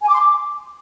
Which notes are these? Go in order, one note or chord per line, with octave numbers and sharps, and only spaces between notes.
G#5
D6
C6
D6